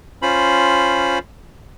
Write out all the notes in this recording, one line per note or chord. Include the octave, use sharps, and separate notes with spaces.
C#4 F4 C5 B5